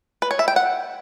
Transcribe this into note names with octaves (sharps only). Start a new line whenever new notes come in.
B4
C#5
E5
G5
F#5